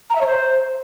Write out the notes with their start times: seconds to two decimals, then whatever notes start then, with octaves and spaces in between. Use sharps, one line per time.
0.10 A#5
0.15 E5
0.21 C#5
0.26 C5